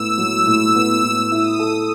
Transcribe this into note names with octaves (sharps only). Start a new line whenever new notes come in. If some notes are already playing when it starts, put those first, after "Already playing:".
Already playing: A2 B3 E6
F#3
A2
B3
A2
E4 D#6
A4